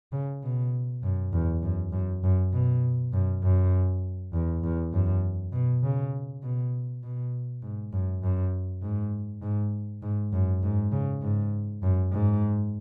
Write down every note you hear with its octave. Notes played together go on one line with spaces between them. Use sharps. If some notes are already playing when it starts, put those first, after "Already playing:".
C#3
B2
F#2
E2
F#2
F#2
F#2
B2
F#2
F#2
E2
E2
F#2
B2
C#3
B2
B2
G#2
F#2
F#2
G#2
G#2
G#2
F#2
G#2
C#3
G#2
F#2
G#2